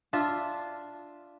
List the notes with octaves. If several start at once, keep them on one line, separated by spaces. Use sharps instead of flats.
D4 F4 E5